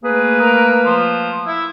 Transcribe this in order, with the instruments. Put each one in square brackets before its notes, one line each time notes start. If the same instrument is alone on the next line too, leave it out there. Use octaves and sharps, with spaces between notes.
[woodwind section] A3 A#3 B4 [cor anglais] G#4
[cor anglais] A#4
F3
E4